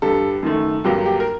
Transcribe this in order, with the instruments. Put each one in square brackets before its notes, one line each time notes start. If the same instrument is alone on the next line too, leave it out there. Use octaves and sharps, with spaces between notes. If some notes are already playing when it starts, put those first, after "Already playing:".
[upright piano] G2 D3 G3 A4
F#2 D#3 A3
G2 D3 F#3 A#3 G4
G4
A#4